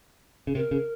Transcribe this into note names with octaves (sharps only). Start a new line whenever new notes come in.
C#3
C3 A#4
C#3